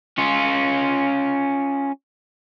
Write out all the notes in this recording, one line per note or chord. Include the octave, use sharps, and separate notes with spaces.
C#4 F4